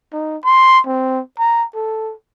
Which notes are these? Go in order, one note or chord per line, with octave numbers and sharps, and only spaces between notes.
D#4
C6
C4
A#5
A4